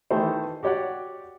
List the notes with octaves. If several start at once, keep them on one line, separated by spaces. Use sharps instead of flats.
D#3 E3 A3 C5
F#4 G4 C#5 D5 F#5